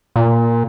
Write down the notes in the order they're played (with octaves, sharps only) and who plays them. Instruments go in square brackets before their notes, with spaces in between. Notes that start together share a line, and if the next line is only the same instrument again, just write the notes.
[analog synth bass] A#2